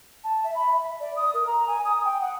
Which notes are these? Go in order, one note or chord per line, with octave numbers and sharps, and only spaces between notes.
A5
E5
B5
E5
D5
D#6
A#4
A#5
G#5
D#6
G5
F#5